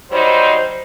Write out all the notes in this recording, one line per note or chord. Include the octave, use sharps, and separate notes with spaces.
F#3 G3 D#4 C5